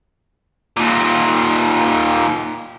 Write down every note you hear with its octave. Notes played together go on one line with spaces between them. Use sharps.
D#2 A#2